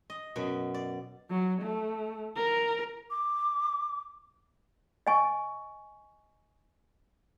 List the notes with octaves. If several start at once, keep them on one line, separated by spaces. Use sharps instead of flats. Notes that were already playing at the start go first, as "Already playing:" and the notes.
D#5
F#2 B2
D5
F#3
A3
A#4
D6
D#5 G#5 C#6